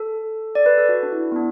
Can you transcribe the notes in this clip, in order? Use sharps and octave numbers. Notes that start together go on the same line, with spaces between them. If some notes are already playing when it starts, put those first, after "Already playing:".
Already playing: A4
D5
B4
A4
F#4
D4
E4
B3
D4